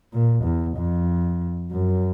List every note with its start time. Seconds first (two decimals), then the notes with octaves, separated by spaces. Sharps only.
0.13 A#2
0.44 E2
0.77 F2
1.71 F#2